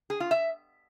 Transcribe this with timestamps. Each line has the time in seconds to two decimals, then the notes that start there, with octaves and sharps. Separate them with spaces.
0.10 G#4
0.20 F4
0.31 E5